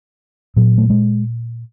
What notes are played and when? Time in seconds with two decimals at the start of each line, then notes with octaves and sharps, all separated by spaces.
0.56 A#2 F#3
0.78 A3
0.90 G#3